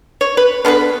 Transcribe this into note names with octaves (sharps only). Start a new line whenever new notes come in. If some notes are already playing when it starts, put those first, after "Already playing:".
C#5
B4
D3 B3 G#4 B4